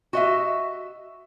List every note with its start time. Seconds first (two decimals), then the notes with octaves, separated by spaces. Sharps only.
0.13 F#4 D#5 E5